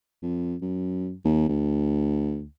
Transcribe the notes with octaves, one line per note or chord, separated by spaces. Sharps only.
F2
F#2
D#2
D2